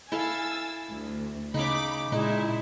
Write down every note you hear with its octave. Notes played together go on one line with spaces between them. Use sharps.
E4 A4 F5 G#5 E6 A6
D2
C#3 C#4 D#4 B5 D6
A#2 G#3 D#4 E4